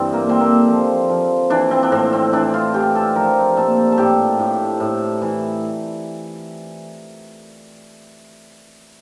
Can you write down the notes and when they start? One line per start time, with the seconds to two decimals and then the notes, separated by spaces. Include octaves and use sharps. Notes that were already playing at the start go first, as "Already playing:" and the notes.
Already playing: G2 E3 C4 D4
0.13 A#3
0.27 D3 C4
0.41 A#3
0.68 F3
1.09 F3
1.50 E3 D4
1.71 C4
1.83 D4
1.92 A2 C4
2.13 C4
2.33 E3 D4
2.54 F4
2.74 E3 G4
2.95 A4
3.15 F3 A#4
3.56 A#2 A4
3.92 A4
3.98 A2 G4
4.39 A2
4.80 A2
5.21 E3